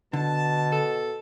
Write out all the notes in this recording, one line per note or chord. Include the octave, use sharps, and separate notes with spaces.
B2 D3 A5
A4